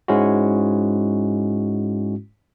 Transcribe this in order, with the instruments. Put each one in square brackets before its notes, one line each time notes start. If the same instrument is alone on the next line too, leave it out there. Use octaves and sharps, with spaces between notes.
[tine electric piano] G#2 G#3 C#4 E4 F#4